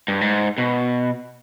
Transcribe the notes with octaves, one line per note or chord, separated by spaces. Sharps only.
G2
G#2
B2